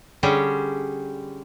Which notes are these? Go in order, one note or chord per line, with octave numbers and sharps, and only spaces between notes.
D3 G3 C#4 G4 G#4